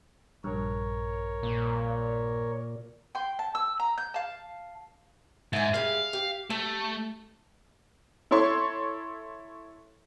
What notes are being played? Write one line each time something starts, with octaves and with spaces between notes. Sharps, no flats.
A#1 G2 A#4 C#5
A#2
G5 C6
A5
E6
A#5
G6
F5 A5
G#2 E5 G#5
G3 G#4 F5
G4
G3 A3
E4 A4 C#5 C6 C#6